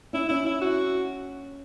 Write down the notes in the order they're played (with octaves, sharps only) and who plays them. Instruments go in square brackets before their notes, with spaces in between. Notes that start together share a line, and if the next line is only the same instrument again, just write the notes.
[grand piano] C#4 [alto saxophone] E4
[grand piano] C#4 [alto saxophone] E4
[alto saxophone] E4
F#4